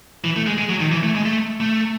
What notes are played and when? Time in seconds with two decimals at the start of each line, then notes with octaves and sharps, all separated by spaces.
0.24 E3
0.36 A3
0.47 G#3
0.58 G#3
0.70 F#3
0.80 D#3
0.92 E3
1.03 A3
1.15 G#3
1.25 A3
1.60 A3